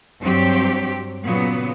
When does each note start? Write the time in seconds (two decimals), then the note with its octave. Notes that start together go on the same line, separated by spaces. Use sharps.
0.21 G2 F#3 C4 G4
1.24 A#2 C#3 F#3 B3